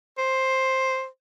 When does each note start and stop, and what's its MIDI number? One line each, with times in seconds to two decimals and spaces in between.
0.18 1.06 72